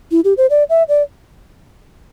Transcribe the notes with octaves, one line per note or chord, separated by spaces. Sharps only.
E4
G4
C5
D5
E5
D5